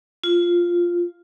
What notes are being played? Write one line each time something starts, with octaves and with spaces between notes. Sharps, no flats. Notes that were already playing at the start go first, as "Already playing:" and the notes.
F4